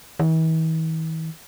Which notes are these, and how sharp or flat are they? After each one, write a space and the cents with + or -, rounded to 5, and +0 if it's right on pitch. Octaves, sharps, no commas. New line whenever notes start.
E3 -45